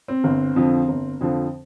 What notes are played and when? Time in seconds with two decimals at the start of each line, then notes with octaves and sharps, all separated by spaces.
0.08 C4
0.24 G1
0.56 F2 D3 F3
0.88 G1
1.21 F2 D3 F3